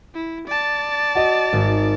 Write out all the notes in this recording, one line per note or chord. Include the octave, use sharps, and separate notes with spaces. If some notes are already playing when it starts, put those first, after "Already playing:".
E4
D5 A5
F#4 D#5
G#1